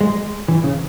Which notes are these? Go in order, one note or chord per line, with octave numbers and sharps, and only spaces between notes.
G#3
E3
C#3